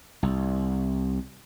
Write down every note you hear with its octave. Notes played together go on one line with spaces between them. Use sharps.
C2